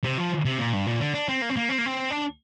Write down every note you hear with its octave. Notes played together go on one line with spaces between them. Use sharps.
C3
F3
C3
A#2
G2
A#2
D3
D4
C4
A#3
C4
A#3
C4
A#3
C4
D4